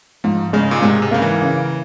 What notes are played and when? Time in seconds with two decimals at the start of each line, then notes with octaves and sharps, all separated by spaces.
0.24 G#2 F3
0.53 C#3 G#3
0.71 A#2
0.82 G#2 C3
1.02 C3
1.11 C#3 A#3
1.22 E3
1.42 C#3